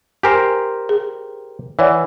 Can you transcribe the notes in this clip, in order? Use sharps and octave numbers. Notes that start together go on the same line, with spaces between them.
G4 A#4 C5 G#5
G#4
E3 C#5 D5 F#5